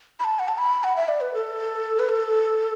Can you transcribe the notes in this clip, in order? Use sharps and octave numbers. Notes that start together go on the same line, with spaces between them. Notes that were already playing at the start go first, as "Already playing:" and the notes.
B5
A5
F#5
A5
B5
F#5
E5
D5
B4
A4
B4
A4